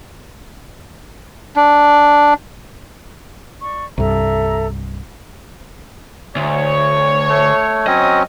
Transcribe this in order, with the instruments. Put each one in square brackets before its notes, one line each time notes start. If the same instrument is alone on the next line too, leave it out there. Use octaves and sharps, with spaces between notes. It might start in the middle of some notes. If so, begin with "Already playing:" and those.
[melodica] D4
[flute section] D5 C#6
[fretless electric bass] C2 G2 [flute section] A4 E5 A#5
[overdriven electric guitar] D2 [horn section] C#5
[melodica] A3
[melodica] F#3 C4 C#4 [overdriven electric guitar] D#5